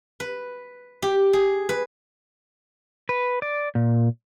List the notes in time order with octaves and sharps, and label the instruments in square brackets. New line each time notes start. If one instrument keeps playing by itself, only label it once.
[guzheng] B4
G4
G#4
B4
[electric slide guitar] B4
D5
A#2